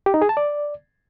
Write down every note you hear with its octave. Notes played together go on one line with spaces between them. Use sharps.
G4
D#4
G#4
A5
D5